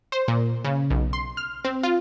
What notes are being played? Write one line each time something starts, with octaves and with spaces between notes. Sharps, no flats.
C5
A#2
C#3
B1
C6
F6
C4
F4